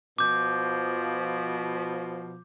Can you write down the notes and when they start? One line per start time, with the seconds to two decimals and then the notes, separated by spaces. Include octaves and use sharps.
0.18 B2 F3 D6 G6